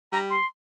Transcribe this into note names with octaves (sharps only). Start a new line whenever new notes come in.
G3 A#5
C6